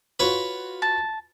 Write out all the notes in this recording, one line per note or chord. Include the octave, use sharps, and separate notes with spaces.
F4 F#4 B4 C#5
A5